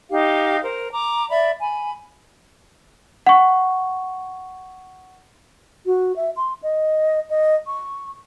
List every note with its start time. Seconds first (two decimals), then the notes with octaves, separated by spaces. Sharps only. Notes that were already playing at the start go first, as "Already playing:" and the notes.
0.10 D#4 G4 F5
0.62 A#4 C5
0.92 A#5 D6
1.30 D5 E5 B5
1.60 G#5 B5
3.26 F#5 C#6
5.86 F#4
6.16 E5
6.36 C6
6.63 D#5
7.30 D#5
7.67 C#6